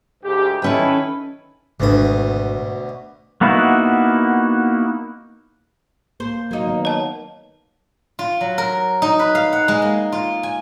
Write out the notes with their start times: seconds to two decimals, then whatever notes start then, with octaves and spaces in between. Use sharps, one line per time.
0.23 D2 G#2 G4
0.62 D#3 C#4 E4 A4 B4 G5
1.80 G#1 D2 B2 D4 D#6
3.41 A#3 B3 D#4 E4 F#4
6.20 A#3 C5
6.51 F#3 A#3 D#4
6.67 D#3 B3
6.85 C#5 A5
8.19 F4
8.41 F#3
8.58 A#4
9.02 D#4
9.19 B4
9.35 F5
9.53 F#5
9.68 G#3
9.82 A#3
10.12 F4
10.43 G#5